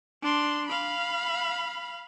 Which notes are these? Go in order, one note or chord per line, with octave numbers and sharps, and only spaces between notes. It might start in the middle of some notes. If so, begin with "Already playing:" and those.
D4 C6
F5 B5